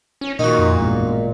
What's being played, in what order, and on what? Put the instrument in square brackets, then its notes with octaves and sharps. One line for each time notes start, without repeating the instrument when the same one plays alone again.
[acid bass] C#4
[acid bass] A#2 [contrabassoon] D#3 [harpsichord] D#4 F#4
[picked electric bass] F2
[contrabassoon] E1 [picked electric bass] A1 G2 G#3